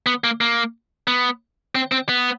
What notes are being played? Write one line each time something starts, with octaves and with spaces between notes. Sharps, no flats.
B3
A#3
A#3
B3
C4
C4
B3